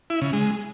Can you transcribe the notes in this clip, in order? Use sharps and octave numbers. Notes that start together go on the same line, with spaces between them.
E4
C#3
G#3